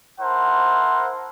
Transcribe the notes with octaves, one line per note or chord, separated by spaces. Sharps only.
E4 A#4 C5 F#5 A5